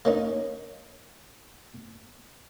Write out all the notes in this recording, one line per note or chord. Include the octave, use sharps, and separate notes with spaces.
A#3 C#4 D#4